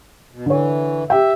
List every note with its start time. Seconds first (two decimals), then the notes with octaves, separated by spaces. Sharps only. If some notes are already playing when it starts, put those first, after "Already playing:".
0.33 B2
0.46 D3 E3 C#5
1.10 G4 E5 G5